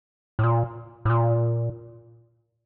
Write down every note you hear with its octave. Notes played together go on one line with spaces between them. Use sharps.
A2
A#2
A2
A#2